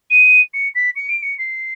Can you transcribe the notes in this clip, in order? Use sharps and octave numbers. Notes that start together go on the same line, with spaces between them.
D#7
C#7
B6
C#7
D7
C#7
C7